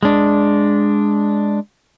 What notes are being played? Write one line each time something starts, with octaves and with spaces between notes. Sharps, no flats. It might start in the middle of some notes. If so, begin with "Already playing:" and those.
G#3 D4